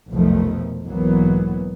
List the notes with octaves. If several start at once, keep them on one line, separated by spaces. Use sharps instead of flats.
F1 B1 B2 D#3 F3 A3
B1 G#2 E3 F#3 A#3 B3